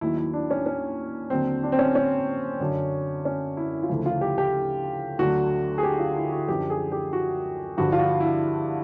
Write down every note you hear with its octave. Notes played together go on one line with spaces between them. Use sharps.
D#2 D#3 F#3 E4
E4
D4
C#4
C#4
D#2 D3 F#3 C4
D4
C4
C#4
C#4
F#2 D3 F#3
C#4
E4
F4
D2 C#3 F3 E4
F4
G4
G4
D2 D3 F#3 F#4
G#4
G4
F4
E4
F#4
F#2 D3 F3 G4
G#4
G4
F#4
G2 D3 F3 F#4
F4
F#4
E4